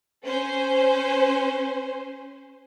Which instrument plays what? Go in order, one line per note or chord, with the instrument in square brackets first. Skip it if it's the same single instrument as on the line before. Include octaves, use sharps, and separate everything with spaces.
[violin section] C#4 C5